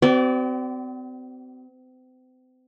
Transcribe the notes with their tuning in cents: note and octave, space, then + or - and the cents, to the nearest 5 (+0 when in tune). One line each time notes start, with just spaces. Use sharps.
C4 -40 F#4 +35 D5 -20